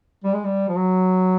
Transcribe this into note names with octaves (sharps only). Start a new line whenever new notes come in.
G3
G#3
G3
F3
F#3